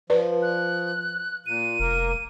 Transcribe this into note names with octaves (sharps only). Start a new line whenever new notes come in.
F3 B4 D5
F#6
A#2 D#7
F1 A#3 A#4